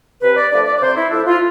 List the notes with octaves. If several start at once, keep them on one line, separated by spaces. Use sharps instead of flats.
C3 B4
D5
F3 A3 D4 D5
D5
D5
C3 C5
E4
F3 A3 D4 E4
F4